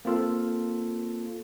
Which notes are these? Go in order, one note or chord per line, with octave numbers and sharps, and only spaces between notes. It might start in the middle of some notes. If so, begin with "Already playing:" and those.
A#3 C4 F4 A4